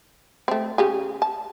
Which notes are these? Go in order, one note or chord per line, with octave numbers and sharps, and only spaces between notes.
A3 C4
C#3 G4 G#4
A5